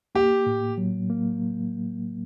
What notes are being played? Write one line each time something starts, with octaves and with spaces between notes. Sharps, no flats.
A#3 G4
A2
F#3
A#3